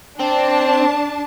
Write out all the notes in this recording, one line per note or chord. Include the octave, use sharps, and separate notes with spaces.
C4 D4 A5